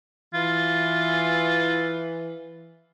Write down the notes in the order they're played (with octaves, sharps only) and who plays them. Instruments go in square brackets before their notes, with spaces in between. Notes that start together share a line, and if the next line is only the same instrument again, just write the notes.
[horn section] E3 [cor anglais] F4